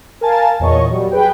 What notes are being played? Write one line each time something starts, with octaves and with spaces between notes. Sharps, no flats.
A#4 F5 G#5 A5 A6
E2 A#2 C#5 D#5 C#6
F#3 G3
G#4 B4 G5